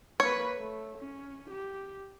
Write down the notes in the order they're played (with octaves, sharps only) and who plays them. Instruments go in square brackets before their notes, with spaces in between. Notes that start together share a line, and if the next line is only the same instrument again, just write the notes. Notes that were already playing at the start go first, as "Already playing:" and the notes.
[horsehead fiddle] A#3 B4 [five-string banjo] C#5
[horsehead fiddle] A3
C#4
G4